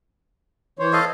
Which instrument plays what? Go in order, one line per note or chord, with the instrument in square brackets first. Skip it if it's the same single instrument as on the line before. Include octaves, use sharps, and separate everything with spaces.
[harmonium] E3 C5 C#5
[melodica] A4 D#5 F5